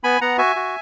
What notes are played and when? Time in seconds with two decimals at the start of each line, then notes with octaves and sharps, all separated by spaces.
0.04 B3 G#5 B5
0.21 B3 F#5 A#5
0.38 F#4 E5 G#5
0.56 F#4